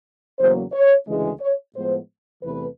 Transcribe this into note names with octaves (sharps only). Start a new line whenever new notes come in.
E2 C#3 F#3 A#3 C5
C#5
D2 C#3 E3 G#3
C#5
A2 F3 G#3 B3 C5
E2 C3 E3 A3 B4